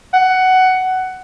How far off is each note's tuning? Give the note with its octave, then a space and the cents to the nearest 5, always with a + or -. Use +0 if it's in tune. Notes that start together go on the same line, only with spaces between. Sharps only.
F#5 +15